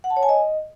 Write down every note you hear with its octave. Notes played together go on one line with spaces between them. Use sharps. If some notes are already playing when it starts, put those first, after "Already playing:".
F#5
A5
C#5
G#5
D#5